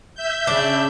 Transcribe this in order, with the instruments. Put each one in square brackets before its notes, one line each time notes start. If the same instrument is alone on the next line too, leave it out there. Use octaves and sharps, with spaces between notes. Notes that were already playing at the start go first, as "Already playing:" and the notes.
[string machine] E5 G6
[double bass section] C#3 [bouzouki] D4